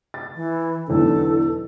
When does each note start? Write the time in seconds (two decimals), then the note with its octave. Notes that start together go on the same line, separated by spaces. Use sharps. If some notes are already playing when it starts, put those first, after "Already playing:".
0.14 A6
0.36 E3
0.88 B1 E2 D3 A4